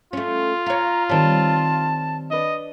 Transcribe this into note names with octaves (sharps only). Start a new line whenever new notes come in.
A3 C#4 F4
C#5 F5 A#5
D#3 G3 C4 C#5 A5
D4 B4 D5 D#5